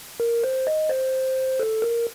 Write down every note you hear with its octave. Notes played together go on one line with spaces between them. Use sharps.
A#4
C5
D#5
C5
A4
A#4